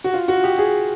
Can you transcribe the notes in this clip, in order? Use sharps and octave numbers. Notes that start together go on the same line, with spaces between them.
F#4
F4
F#4
G4
G#4